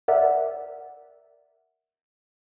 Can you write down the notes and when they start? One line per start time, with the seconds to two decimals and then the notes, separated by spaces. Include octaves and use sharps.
0.08 A#4 D5 E5 F#5